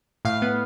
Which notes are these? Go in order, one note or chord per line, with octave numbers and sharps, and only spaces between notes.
A2 F5
B3